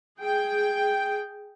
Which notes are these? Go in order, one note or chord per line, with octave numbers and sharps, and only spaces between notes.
G#4 G5